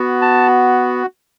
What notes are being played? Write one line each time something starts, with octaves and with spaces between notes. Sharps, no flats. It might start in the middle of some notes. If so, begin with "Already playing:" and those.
Already playing: B3 F#4
A5